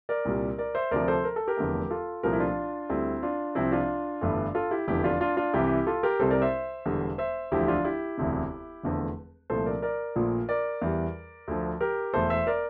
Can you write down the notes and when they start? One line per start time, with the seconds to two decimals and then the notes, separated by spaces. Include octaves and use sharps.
0.09 A#4 D5
0.25 C2 A#2 G3
0.58 A#4 D5
0.75 C5 E5
0.91 D2 C3 F3 A#4 D5
1.08 A4 C5
1.24 A#4
1.36 A4
1.47 G4 A#4
1.57 F1 E2 D3 A3
1.90 F4 A4
2.23 C2 A#2 F3 A3 G4 A#4
2.33 E4
2.40 D4 F4
2.89 D2 D3 G3 C4 E4
3.23 D4 F4
3.55 C2 C3 F3 C4 E4
3.72 D4 F4
4.21 G1 G2 E3 A3
4.55 F4 A4
4.71 E4 G4
4.88 F1 E2 D3 E4 G4
5.04 D4 F4
5.20 D4 F4
5.37 D4 F4
5.53 C2 C3 E3 E4 G4
5.87 F4 A4
6.03 G4 A#4
6.20 C2 C3 G3 A4 C5
6.31 A#4 D5
6.42 C5 E5
6.86 E1 E2 D3 G3
7.18 C5 E5
7.52 E1 D2 D3 F3 A3 E4 G4
7.68 D4 F4
7.84 E4 G4
8.18 E1 D2 C3
8.83 F1 E2 D3 F3 A3
9.50 C2 A#2 F3 A3 A4 C5
9.66 A#4 D5
9.82 A#4 D5
10.16 A#1 A#2 F3 A3
10.49 A#4 D5
10.82 E2 E3 G3
11.48 D2 D3 F3
11.81 G4 A#4
12.14 E1 E2 E3 A3 A4 C5
12.30 C5 E5
12.47 A#4 D5